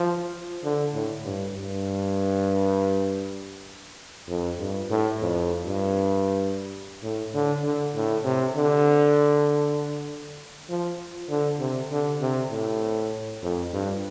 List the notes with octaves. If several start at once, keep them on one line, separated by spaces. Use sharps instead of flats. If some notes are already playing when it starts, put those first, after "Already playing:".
Already playing: F3
D3
A2
G2
G2
F2
G2
A2
F2
G2
A2
D3
D3
A2
C3
D3
F3
D3
C3
D3
C3
A2
F2
G2